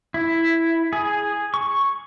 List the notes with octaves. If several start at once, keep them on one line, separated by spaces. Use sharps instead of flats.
E4
G#4
C#6